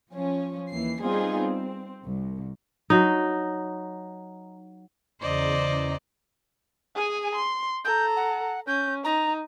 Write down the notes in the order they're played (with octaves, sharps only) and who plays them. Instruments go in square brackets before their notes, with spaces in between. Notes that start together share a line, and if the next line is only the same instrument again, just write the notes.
[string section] F3 C#4
D#2 E3 C7
G3 B3 C4 D#4 F4 G#4
C4
C2
[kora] F#3 D#4
[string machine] E2 C#3 A#5 [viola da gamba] C5 D5 D#5
[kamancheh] G#4 G#5
C6
[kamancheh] A4 A#5 [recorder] G6
[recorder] F#5
[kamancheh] C#4 [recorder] G6
[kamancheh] D#4 [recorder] A#5